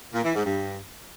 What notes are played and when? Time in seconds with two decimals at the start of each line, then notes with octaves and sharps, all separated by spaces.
0.14 A#2
0.24 E3
0.35 G#2
0.46 G2